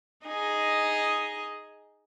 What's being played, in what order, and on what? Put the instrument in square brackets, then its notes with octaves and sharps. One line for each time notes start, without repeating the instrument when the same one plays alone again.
[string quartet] D#4 G#4 D#5